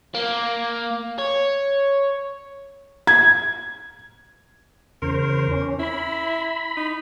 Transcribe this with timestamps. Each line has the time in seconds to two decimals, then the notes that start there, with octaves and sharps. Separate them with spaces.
0.14 A#3
1.19 C#5
3.07 G#6
5.02 E2 C#3 A#4 C5
5.51 C#4
5.79 E4 B5
6.77 D#4